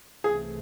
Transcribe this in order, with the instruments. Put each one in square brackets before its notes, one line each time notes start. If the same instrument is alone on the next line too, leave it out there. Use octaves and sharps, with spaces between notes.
[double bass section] C2 C3 E3 A3 [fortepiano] G#4